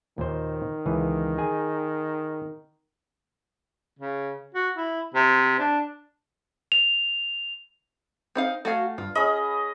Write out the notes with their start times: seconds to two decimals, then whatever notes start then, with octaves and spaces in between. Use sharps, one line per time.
0.18 D#2 A#2 D#3 C5
0.86 C#2 E3 G#4
1.38 G#4 G#5
3.99 C#3
4.55 F#4
4.77 E4
5.15 C3
5.59 D4
6.72 F7
8.35 C4 D#4 F5
8.65 A3 F#4 F5 G#5
8.98 G2 F4
9.15 C#4 G#4 D#5 B5